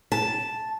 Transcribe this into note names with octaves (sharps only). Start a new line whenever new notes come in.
A5